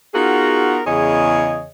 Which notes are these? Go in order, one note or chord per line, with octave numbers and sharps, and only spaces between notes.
B3 D#4 F4 F#4 G#4 A#4
E2 C#3 G#4 C#5 D#5